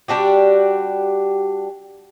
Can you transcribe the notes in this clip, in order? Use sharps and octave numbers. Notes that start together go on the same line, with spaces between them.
G3 D4 F#4 G4